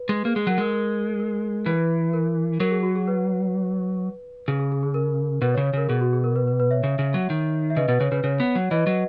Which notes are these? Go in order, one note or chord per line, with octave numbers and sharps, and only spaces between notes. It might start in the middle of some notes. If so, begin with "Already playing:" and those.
Already playing: B4
G#3
A#3 G#4
G#3 G#4
F#3 A#4
G#3 A#4
A#4
A#4
E3 B4
A#4
F#3 A#4
G#4
F#4
G#4
B4
C#3 G#4
G#4
G#4
G#4
A#4
B2 B4
C#5
C#3
C#5
C#3 A#4
B2 G#4
F#4
G#4
A#4
B4
B4
B4
C#5 E5
C#3
C#3
F#3
D#3
E5
C#3 B4 D#5
B2 B4
C#3 C#5
C#3 B4
C#3 C#5
B3
F#3
E3 B4 D#5
F#3